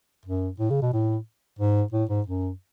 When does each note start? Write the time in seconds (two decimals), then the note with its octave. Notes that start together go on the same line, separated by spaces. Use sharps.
0.25 F#2
0.59 A2
0.70 C#3
0.82 B2
0.93 A2
1.59 G#2
1.92 A2
2.09 G#2
2.26 F#2